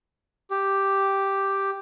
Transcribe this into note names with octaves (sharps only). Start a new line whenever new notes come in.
G4